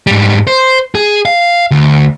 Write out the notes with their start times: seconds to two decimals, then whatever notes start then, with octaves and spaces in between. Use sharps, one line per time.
0.07 G#2 G3
0.47 C5
0.95 G#4
1.25 F5
1.71 D2